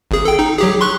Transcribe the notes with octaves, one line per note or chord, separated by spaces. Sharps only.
G#1 G#4
A4 G5
D#4
F#3 G4 G#4
C6 C#6 F#6